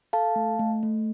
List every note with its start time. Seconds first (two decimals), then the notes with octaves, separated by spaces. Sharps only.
0.13 A4 F5 A5
0.36 A3
0.59 A3
0.83 A3